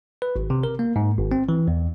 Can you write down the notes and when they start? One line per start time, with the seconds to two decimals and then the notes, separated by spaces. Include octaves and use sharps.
0.22 B4
0.36 G#1
0.50 C3
0.63 A#4
0.79 A#3
0.96 G#2
1.18 G#1
1.32 C4
1.49 E3
1.68 E2